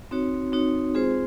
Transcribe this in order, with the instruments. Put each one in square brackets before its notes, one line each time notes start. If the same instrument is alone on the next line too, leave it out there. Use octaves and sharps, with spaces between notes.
[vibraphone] C4 D#4 F#4 C#5
C4 D#4 F#4 C#5
G#3 C4 F4 G#4 C5